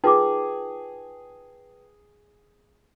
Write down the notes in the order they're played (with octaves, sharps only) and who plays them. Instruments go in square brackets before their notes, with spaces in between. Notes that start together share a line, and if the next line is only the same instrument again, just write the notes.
[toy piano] D#4 F4 D6 [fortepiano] G#4 [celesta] B4 G5 A5